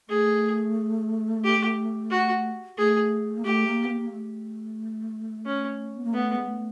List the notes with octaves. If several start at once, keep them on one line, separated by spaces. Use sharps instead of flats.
A3 G#4
G4
F#4
A3 G#4
A#3
A3 G4
A#3
B3
A#3
A3
C#4
B3
A#3
A3 B3
G#3
A3